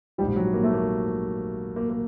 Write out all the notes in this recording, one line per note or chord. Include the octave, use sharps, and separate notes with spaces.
A#1 G#2 F3 G3
F#3
A#3
A3
A#3
A#3
A#3